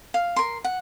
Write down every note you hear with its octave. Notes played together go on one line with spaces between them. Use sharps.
F5
A#4 C6
F#5